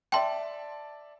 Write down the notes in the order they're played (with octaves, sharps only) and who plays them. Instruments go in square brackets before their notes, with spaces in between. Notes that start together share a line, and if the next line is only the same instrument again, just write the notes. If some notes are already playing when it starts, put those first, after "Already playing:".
[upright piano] D5 E5 A5 [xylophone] G5 C6